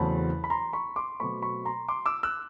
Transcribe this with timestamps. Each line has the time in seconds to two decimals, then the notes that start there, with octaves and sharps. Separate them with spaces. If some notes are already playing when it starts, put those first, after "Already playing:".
Already playing: E2 C#3 F#3 A3 C4 A5 B5
0.44 B5
0.50 A#5 C6
0.73 B5 C#6
0.96 C6 D6
1.20 B2 F#3 A3 C4 B5 C#6
1.42 B5 C#6
1.65 A#5 C6
1.88 C6 D6
2.06 D6 E6
2.23 E6 F#6